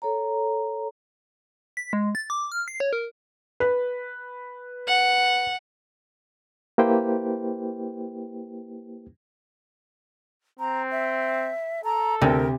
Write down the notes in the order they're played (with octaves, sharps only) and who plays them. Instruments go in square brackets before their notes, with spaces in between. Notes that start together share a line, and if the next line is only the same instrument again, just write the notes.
[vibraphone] A4 C#5 A#5
[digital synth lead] B6
G#3
A6
D6
F6
C7
C#5
A#4
[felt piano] B4
[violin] F#5
[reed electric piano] A#3 E4 G4 B4 C5 G5
[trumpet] C4 [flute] A#5
[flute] E5
[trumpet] A4 [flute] A#5
[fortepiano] D2 [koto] C3 [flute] A#4